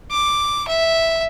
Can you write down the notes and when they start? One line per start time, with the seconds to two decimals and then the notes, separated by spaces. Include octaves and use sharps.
0.11 D6
0.67 E5